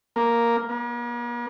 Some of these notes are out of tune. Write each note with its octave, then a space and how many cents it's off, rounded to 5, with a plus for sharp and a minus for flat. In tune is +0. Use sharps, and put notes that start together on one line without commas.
A#3 +0
A#3 +45